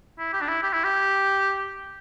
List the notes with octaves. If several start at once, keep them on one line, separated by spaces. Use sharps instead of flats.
E4
G4
D4
E4
G4
E4
G4